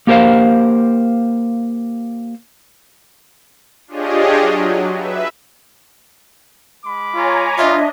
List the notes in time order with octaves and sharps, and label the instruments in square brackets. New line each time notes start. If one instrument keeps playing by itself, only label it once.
[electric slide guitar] A#3 G4 A#4 C5 F5
[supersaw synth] D4 F4 G4 G#4 C#5 D#5
F#3
B4 E5
[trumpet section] G#3 B5 D6
[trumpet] F4 [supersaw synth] C#5 G#5 A#5
[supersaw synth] D4 D#5 [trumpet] F4 [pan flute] E5